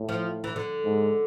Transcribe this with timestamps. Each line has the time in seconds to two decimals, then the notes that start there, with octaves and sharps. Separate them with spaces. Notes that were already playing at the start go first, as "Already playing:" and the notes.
Already playing: A2
0.09 F3
0.44 E3
0.56 D3
0.85 G#2